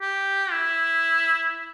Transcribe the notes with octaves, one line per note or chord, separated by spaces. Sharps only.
G4
E4